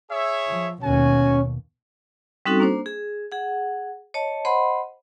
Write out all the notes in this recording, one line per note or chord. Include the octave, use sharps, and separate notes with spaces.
G#4 C#5 E5
F3
D#2 B2 C#4 F#4 G#5
G3 C4 C#4 D#4 F#4 A4
A#3 D4 C5
G#4
G#4 F#5
C#5 D#5 A5
C5 D#5 F#5 B5 C6